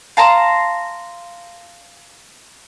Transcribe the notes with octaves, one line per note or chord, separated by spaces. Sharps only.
F5 A5 A#5 C6